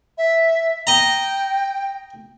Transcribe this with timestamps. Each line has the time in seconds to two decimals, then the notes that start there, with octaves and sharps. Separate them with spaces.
0.18 E5
0.87 D#5 G5 A#5